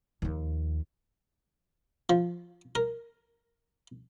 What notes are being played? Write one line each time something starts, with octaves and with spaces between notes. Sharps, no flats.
D#2 F3
F3
A#4